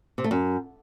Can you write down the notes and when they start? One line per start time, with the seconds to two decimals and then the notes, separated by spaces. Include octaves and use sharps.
0.18 C3
0.24 A3
0.31 F#2